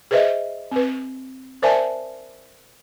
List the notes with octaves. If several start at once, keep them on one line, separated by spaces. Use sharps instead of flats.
G#4 B4 C5 D#5 E5
C4 B4
A#4 C5 D5 E5 G#5 A5